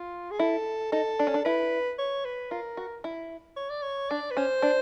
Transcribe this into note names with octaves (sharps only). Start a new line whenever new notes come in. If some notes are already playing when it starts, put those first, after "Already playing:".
Already playing: F4
G#4
E4 A4
D#4 A4
D4
C#4
D4
E4 B4
C#5
B4
F4 A#4
F#4
E4
C#5
D5
C#5
D4 D5
B4
C#4 C5
D4